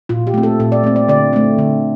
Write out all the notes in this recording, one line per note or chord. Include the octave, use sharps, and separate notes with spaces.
A#2 F4
G4
A3 C4
A4
A#2 A4
D5
A3 C4
D5
D3 D5
A3 C4
D3